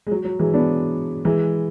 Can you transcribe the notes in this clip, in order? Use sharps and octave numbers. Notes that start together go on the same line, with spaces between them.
G#3
F#3
F#3
E3 G#3
B3 D4
E3 G#3